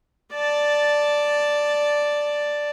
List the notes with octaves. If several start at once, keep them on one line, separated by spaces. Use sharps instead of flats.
D5 A5